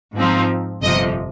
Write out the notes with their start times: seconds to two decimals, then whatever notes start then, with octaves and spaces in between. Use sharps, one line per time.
0.15 G#2 F3 C4 D#4
0.82 G1 F2 C3 F3 D#5